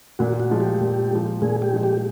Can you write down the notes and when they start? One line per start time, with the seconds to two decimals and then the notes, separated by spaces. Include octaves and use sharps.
0.19 A#2 F#4
0.40 F#4
0.50 F3 G#3
0.60 G4
0.81 A#2
1.11 F3 G#3
1.42 A#2 G#4
1.62 G4
1.73 F3 G#3
1.83 G4